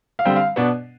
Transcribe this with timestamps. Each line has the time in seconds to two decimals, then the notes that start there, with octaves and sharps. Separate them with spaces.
0.19 F5
0.25 D3 G3 C4 G5
0.36 F5
0.56 B2 B3 D4